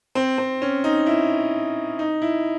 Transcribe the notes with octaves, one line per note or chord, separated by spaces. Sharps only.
C4
C4
C#4
D#4
E4
D#4
E4